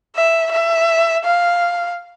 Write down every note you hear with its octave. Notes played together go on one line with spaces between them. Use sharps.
E5
E5
F5